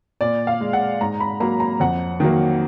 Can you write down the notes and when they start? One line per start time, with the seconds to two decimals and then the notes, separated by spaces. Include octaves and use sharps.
0.21 A#2 D5
0.47 F5
0.61 G#3
0.73 F#5
1.01 G#2 A#5
1.20 B5
1.40 F#3 A#3 A#5
1.60 A#5
1.80 F2 F#5
2.20 D#3 F#3 A#3